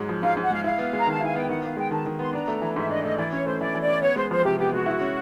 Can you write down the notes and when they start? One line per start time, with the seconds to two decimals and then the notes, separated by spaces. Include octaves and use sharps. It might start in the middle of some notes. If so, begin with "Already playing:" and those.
Already playing: G#2 F#3 G#3
0.09 F3
0.22 G#2 F5
0.37 G#2
0.43 F#5
0.50 G#3 F5
0.64 E4 F5
0.78 B3
0.93 G#3 A#5
1.07 D#3 A5
1.21 E4 G#5
1.35 B3 G5
1.49 D#3 F#5
1.63 B3 F5
1.77 G#3 G5
1.91 D#3 A5
2.06 D#3
2.19 B3 C6
2.33 D4 A#5
2.48 A3
2.62 E3
2.76 G#2 E5
2.89 D4 D#5
3.03 A3 D#5
3.18 E3 D5
3.32 C#4 C#5
3.46 A3 C5
3.60 E3 D5
3.75 E3
3.81 D5
3.88 C#4
4.02 B3 C#5
4.16 G#3 C5
4.30 F3 C5
4.44 C3 G4
4.58 B3 G4
4.73 G#3 F#4
4.86 E4
5.01 C#4